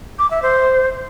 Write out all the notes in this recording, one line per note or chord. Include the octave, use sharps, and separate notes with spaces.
D6
E5
C5